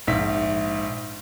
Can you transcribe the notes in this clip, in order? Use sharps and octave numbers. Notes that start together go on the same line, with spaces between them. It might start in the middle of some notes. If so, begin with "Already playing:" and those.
A#1 G#2 E5 B6